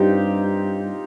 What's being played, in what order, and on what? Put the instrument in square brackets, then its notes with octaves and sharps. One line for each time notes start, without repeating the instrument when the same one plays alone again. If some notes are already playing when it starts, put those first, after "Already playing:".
Already playing: [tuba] G2 [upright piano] C4 D#4 F4 G4